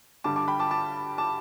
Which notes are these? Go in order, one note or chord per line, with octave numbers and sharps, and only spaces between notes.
G2 D3 G3 A5 D6
A5 D6
G5 B5
A5 D6
A5 D6
A5 D6